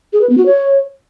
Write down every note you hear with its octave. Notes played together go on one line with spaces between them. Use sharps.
G#4
B4
B3
F#4
C#5